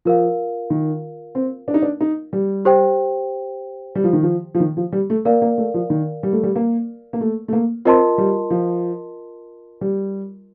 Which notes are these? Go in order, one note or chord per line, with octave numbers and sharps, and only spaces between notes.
F3 F4 A#4 F5
D#3
C4
D4
D#4
D4
D#4
G3
G4 C5 G5
G3
F3
D#3
F3
F3
D#3
F3
G3
A3
A#3 A#4 D5 F5
A#3
A3
F3
D#3
G3
A3
G3
A#3
A#3
A3
A3
A#3
C4 F4 A#4 D#5 A5 C6
G3
F3
G3